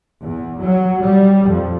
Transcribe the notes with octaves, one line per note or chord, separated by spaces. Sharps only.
E2
F#3
G3
F2